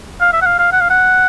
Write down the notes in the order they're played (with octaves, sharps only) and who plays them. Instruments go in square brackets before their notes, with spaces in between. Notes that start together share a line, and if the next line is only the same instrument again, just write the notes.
[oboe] F5
E5
F#5
F5
F5
F#5
F5
F#5